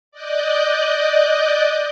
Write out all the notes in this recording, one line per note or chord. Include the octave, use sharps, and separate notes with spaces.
D5 D#5 F#6 G6